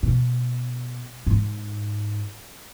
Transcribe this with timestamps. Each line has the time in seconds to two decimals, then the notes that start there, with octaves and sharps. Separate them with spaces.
0.03 B2
1.27 G#2